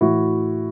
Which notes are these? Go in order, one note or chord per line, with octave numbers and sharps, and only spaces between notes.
A2 E3 E4 F#4